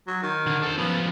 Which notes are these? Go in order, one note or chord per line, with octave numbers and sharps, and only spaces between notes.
F#3
D#3
D3
A4 C5
F3 B3 C#4